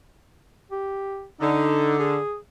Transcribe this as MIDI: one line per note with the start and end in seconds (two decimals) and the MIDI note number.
0.71 1.25 67
1.41 2.17 50
1.41 1.95 63
1.99 2.36 68